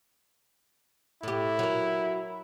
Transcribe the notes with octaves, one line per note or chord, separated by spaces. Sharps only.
A2 E4 G4
F#3 A#4